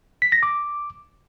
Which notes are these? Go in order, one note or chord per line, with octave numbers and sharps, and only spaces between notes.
B6
A#6
D6